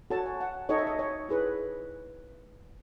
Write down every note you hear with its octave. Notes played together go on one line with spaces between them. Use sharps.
F#4 A4 C#5 A5
G#5
F#5
D#4 A4 C#5 D#5
E5
D#5
C#5
E4 G#4 B4